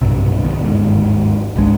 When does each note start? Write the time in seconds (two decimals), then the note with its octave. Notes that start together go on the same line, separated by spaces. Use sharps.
0.02 B1 G2 C3
0.44 D1 D#3 B3
0.64 G1 D#2 G#2
1.56 G#1 C#2 G#3 D4